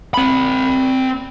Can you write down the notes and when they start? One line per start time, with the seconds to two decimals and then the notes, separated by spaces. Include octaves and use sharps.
0.14 C4 B5